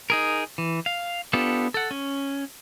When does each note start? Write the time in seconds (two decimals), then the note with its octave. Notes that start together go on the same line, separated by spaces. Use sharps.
0.10 D#4 G#4 A#4
0.58 E3
0.86 F5
1.33 B3 D4 F4 G4 A4
1.74 A4 F#5
1.91 C#4